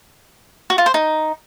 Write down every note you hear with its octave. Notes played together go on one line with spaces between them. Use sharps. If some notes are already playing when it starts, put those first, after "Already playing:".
F#4
F4
C5
D#4